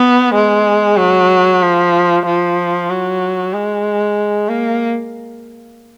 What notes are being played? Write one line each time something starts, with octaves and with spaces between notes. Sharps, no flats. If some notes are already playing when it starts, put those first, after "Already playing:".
Already playing: B3
G#3
F#3
F3
F3
F#3
G#3
A#3